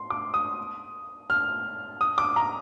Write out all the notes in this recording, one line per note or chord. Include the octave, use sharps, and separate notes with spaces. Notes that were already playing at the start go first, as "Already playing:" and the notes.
Already playing: C6
D6
D#6
F6
D#6
D6
A#5